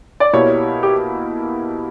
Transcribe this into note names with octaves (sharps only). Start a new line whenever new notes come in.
D5
B2 A#3 E4 G4 C#5
G4